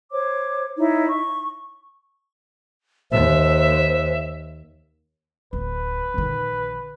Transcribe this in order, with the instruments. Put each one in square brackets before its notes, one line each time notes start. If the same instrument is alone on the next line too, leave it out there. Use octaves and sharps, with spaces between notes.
[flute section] C5 C#5 D6
D#4 E4 C#5
C#6
[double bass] D#2 [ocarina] C5 [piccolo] E5
[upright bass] D1 [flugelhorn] B4
[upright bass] A#1 D#3